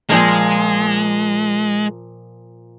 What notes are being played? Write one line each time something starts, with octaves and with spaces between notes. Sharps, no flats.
A#2 F3 G#3 A#3